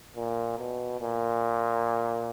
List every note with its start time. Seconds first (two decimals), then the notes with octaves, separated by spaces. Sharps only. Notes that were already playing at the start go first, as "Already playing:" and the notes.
0.16 A#2
0.58 B2
1.00 A#2